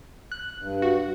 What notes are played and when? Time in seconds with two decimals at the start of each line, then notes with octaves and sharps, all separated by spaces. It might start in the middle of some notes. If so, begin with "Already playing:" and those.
0.31 F#6
0.58 G2
0.82 F#4